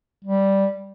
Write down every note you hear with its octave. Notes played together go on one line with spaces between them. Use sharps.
G3